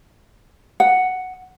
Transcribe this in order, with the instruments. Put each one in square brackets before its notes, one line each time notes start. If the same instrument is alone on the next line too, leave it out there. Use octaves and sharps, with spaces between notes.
[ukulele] F#5